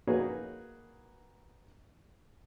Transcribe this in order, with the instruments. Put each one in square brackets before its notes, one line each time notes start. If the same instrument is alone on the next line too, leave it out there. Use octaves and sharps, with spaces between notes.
[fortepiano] A#3 D#4 F#4 G#4 B4 C#5